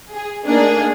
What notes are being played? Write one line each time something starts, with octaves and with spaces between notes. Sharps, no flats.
G#4
A3 A#3 D4 D#4 G#4